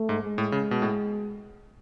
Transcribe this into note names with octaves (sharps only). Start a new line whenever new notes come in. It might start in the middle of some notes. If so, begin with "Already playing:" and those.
Already playing: A3
G#2
G#3
A2
C#3
B2
A2